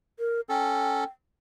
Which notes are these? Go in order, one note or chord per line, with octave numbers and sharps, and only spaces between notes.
A#4
C#4 A4 G5